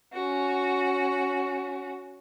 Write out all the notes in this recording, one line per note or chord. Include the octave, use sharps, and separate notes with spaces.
C#4 F#4